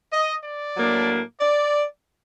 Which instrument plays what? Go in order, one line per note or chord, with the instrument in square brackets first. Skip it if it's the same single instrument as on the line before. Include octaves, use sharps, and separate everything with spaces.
[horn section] D#5
D5
A2 F#3 A#3 D4
D5